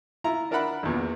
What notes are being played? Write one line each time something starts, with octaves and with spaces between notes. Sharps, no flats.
E4 F4 A#5
D4 A#4 D5 E5 F#5 B5
A#1 E2 A#2